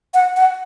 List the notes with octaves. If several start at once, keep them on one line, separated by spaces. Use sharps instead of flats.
F#5
F#5